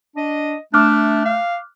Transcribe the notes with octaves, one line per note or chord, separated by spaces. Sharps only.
D4 D#5
A3 D4 D6 F6 F#6
F5